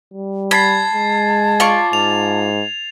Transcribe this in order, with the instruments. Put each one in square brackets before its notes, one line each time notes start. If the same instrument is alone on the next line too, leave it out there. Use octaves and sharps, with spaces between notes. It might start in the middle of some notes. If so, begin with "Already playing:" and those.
[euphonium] G3
[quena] A5 [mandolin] B5 [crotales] G#6 A6 C7
[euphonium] G#3
[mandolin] F4 D5 C#6
[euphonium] G#2 [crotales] F7